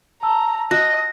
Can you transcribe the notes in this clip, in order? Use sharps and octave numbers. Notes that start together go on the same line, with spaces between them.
A5 A#5 E6
F#4 D#5 A#6